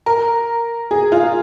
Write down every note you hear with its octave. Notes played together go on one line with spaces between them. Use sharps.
A#4
G#4
F4